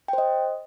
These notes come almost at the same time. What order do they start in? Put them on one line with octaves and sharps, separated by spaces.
G5 C5 D#5